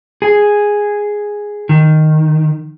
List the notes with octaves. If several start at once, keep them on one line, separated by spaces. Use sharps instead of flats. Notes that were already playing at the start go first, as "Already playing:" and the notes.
G#4
D#3